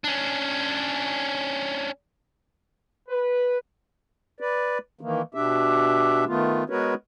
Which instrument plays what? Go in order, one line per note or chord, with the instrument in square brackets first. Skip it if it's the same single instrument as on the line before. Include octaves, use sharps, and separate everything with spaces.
[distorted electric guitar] C#4 D4
[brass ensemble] B4
[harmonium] B4 D5
D#3 E3 A#3
B2 D4 G4 E5
D#3 A3 B3 F4
G#3 B3 F#4 A#4 B4 C#5